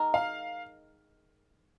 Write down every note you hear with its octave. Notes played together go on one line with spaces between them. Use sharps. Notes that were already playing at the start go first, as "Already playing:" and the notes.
Already playing: D#3 G#3 D#4 A#4
F5